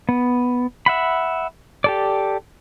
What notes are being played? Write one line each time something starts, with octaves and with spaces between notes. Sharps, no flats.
B3
E5 F#5 B5
G4 A4 D5